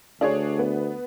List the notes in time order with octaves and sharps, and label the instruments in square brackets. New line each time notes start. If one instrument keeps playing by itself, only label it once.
[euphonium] D2 [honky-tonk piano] D4 G#4 C#5
[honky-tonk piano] B3